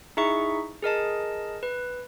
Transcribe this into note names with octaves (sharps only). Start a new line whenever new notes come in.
D#4 E4 G#4 E5 C#6
G#4 A#4 D#5 A5
B4